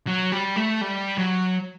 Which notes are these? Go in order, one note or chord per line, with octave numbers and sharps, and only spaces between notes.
F#3
G3
A3
G3
F#3